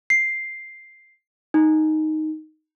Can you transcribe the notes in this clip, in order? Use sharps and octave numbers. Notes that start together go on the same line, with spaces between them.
C7
D#4